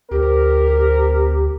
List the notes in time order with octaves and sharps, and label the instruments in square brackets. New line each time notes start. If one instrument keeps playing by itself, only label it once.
[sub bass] D2 [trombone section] C4 A#4 [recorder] G4